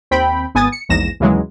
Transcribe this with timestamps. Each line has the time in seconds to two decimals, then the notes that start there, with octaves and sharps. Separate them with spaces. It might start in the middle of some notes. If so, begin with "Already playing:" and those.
0.11 D#2 C4 G5 B5
0.55 G#1 B3 G#5 D#6 A6
0.72 C#7
0.89 A#1 E2 G#2 A#6 E7
1.20 D#2 C#3 E3 F#3 G#3